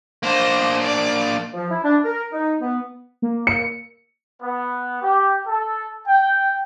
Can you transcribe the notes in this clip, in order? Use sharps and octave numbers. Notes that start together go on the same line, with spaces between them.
A#3 D4 C5 D#5
D5 D6
F3
E4
D4
A#4
D#4
B3
A#3
C#7
B3
G4
A4
G5